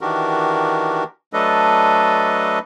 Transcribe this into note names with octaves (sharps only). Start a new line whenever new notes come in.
D#3 E3 D4 F#4 G4 A#4
F#3 A3 D4 A4 B4 D#5